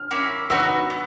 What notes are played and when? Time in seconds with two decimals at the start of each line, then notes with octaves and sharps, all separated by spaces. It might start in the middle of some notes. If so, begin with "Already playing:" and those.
Already playing: F6
0.11 A#3 C#4 E4
0.50 B3 D#4 F#4 E6
0.90 B3